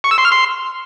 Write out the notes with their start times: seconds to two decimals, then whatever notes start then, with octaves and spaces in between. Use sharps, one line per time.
0.04 C#6
0.11 E6
0.18 C6
0.25 F6
0.32 C6